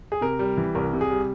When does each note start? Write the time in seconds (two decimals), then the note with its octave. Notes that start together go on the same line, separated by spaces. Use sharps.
0.12 G#4
0.21 C3 A#4
0.39 G3
0.57 E3
0.75 C2 A#4
0.93 C3
1.01 G#4
1.11 G3